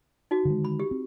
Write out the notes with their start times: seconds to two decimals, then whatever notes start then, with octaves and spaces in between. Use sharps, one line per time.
0.31 D#4 F#4
0.45 D3 D#3 G#3
0.65 B5
0.80 G4
0.91 C4